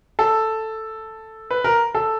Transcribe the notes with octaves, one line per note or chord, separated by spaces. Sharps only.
A4
B4
A#4
A4